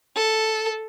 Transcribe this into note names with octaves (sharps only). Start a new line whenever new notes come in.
A4